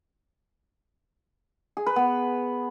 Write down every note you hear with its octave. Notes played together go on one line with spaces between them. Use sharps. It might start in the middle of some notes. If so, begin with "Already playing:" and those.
G#4
B4
B3